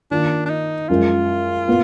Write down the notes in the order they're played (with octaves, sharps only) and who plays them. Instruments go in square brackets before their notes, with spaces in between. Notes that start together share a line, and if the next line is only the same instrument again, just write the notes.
[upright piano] D#3 A#3 F4 [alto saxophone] D4
[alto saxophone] D4
D#4
[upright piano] F#2 F3 G#3 [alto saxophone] F4
[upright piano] A#2 B3